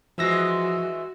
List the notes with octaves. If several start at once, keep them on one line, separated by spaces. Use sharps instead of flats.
E3 F3 G#3 F#4 E6 A#6